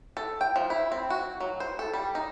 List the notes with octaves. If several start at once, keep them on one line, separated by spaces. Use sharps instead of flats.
A4
G5
F3
E4
C4
F#4
F#3
C5
A4
G3
D#4